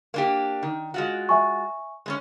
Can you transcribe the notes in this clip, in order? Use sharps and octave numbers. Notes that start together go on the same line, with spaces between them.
A#3 D4 G4
D#3
G#3 F4 F#4
E5 G#5 C#6
G#3 B3 C#4